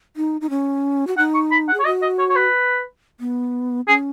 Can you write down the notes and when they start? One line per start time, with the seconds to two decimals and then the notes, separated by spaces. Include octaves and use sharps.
0.17 D#4
0.41 D#4
0.50 C#4
1.07 F#4
1.17 D#4 F#5
1.34 C#6
1.51 B5
1.68 F#5
1.74 G#4
1.80 C#5
1.85 F#4 D#5
2.02 D#5
2.19 C#5
2.29 C#5
2.36 B4
3.20 B3
3.88 C#4 G#4